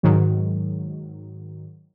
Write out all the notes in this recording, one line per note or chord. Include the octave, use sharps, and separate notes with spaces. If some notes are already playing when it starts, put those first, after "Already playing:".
G#2 D#3 F#3